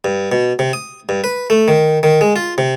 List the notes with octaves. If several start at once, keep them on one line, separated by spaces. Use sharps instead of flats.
G2
B2
C3
D#6
G2
B4
A3
D#3
D#3
G#3
F4
C3